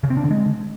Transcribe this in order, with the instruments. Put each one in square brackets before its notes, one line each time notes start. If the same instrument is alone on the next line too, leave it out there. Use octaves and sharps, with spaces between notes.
[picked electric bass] C#3
C4
D4
D3
G#3